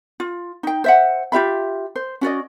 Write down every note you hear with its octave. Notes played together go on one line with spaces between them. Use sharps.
F4
D#4 G5
C5 E5 F#5
F4 G4 E5 B5
C5
C#4 F#4 D5 D#5